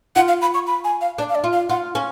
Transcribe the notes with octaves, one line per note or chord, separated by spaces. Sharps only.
F4 F#5
F5
B5
C#6
B5
G#5
F5
D4 D5
F5
D5
F4
F5
F4 F#5
C#4